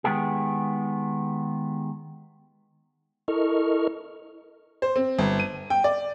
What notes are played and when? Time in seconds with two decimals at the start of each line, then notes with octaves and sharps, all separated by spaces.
0.04 D#3 G#3 B3 G4 G#4
3.28 E4 A4 A#4 D#5 C#6 F6
4.82 C5
4.96 C4
5.19 G1
5.40 D#7
5.70 G5
5.84 D5